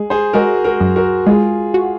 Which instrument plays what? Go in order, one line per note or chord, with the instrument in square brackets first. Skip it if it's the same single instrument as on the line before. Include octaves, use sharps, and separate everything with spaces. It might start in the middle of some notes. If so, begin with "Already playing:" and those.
Already playing: [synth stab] G#3 [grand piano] G#4
[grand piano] G#4 C5
[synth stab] G#3 [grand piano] F#4 A#4
[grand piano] F#4 A#4
[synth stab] F#2
[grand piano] F#4 A#4
[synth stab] G#3 [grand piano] F4 G#4
[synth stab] F#4